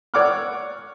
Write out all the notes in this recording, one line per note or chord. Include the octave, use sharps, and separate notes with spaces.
C#5 D5 F#5 D6 E6 F6